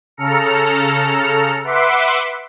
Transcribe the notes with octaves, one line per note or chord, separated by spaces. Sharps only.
C#3 A4 A#5 F6 C#7
B4 E5 F#5 C6 D6 B6